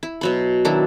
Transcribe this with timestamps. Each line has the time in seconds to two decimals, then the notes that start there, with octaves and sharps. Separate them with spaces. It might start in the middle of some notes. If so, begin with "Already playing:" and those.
0.03 E4
0.21 B2 F#3 B5
0.65 D#3 F#3 D4 E4